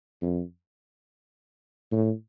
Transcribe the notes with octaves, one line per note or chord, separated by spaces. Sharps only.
F2
A2